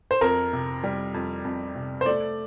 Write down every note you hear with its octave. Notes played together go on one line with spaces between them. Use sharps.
C5
F2 A#4
C3
G3
F2
F2
C3
C5
A3 D5